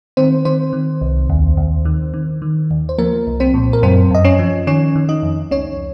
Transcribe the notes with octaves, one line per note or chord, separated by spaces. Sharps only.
D#3 C4 C5
D#3 C4 C5
D#3
C2
D#2
D#2
D#3
D#3
D#3
D#2
C5
F3 A#3 A#4
C2
C4 C5
A#2
A#4
F#2 C4 C5
F#2 D#5
C#4 C#5
F3
D#3 C#4 C#5
D#3
D#4 D#5
F2
C#2 C#4 C#5